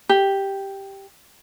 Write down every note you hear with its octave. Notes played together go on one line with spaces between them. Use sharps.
G4